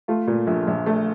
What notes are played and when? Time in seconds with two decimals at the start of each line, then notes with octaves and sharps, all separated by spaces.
0.08 A3 F4
0.27 A#2
0.47 A#1
0.67 A#1
0.86 A3